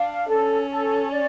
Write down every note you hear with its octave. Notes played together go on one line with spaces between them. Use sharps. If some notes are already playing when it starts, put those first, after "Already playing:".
Already playing: D4 F5
C#4 A4
A4
D5